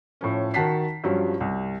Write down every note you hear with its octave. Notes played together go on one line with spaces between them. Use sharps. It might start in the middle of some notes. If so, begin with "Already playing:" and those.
A2 F3 C#4
D#3 F#4 F#5 A5 B6 C7
G2 F3 F#3 C#4
C2